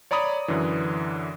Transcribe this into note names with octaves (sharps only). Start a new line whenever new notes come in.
C#5 D5 A#5 B5 D#6
F#2 D3 E3